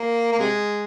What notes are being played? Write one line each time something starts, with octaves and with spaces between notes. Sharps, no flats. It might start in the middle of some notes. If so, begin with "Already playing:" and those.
Already playing: A#3
A#3
C3 G#3